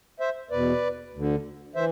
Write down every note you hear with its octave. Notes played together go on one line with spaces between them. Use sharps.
C5 E5
E2 B2 B4 D5
D2 D3
E3 C5 E5